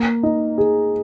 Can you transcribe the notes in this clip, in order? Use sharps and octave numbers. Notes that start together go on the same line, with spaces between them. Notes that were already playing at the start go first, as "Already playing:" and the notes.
Already playing: A#3
D#4
G#4